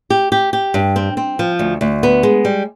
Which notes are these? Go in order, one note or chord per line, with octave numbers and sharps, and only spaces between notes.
G4
G4
G4
G2
C4
C4
F3
D2
D2
B3
G#3
G3